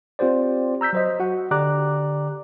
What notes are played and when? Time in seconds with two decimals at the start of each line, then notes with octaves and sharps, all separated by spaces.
0.19 C4 F4 G4 C5 D5
0.81 A#5 E6 G6 B6
0.93 F#3 C5 D#5
1.20 F#4 F#5
1.51 D3 G4 D5 A#5 D6 F#6